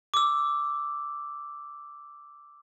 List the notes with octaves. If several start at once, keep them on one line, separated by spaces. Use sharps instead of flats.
D6 E6